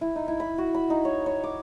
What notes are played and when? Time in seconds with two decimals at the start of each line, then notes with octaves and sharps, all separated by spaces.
0.01 E4
0.16 D#4
0.28 E4
0.40 B5
0.58 F#4
0.74 B5
0.90 D#4
1.05 C#5
1.26 C#5
1.44 D6